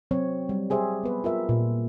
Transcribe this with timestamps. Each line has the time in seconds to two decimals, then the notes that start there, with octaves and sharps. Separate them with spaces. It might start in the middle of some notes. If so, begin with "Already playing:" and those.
0.11 F#3 C4 C#5
0.49 G3
0.70 G4 G#4 C5 E5
1.03 B3 B4
1.24 F4 A#4 E5
1.49 A#2